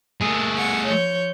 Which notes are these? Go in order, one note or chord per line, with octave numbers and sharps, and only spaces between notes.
A3 A#3 G#4
F#5 G#6
F3 C#5 G6